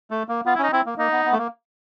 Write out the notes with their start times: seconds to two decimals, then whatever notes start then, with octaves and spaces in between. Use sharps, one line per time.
0.11 A3
0.29 A#3
0.46 B3 F4
0.55 E4
0.59 C#4
0.63 D#4
0.72 C4 E4
0.86 A#3
0.98 A#3 D#4
1.12 B3
1.26 B3
1.32 A3
1.38 A#3